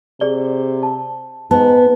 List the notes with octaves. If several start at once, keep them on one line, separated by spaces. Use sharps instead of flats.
C3 G#4 D5 G7
A5
G#2 B3 A5